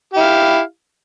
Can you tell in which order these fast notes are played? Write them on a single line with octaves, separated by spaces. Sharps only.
G4 E4 F5